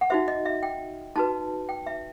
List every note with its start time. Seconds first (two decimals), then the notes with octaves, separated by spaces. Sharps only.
0.01 F#5
0.10 D#4 F#4 C5 E5
0.28 D#5
0.46 E5
0.63 G5
1.16 D#4 F#4 B4 A5
1.69 G5
1.86 E5